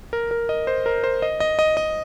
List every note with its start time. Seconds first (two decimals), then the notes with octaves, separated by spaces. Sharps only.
0.13 A#4
0.31 A#4
0.49 D#5
0.67 C5
0.86 A#4
1.04 C5
1.22 D#5
1.40 D#5
1.59 D#5
1.77 D#5